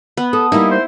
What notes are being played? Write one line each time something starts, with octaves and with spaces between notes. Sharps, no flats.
B3
A4 D#6
G3 A#3 D#4 E4
C5